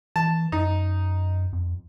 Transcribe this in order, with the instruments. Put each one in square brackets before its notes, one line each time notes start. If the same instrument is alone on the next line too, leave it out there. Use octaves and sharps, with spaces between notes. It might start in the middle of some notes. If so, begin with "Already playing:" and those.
[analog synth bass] E3 [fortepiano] A5
[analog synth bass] F#2 [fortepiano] D#4
[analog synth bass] F2